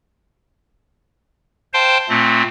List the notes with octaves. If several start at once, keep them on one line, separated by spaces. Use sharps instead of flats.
C5 F5 G5 A5 C6
A#2 A3 C4